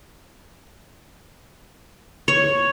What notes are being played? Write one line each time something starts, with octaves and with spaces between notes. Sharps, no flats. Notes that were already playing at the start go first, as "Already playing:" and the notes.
C#5